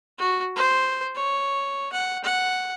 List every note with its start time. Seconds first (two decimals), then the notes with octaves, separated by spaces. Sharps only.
0.18 F#4
0.56 C5
1.15 C#5
1.92 F#5
2.24 F#5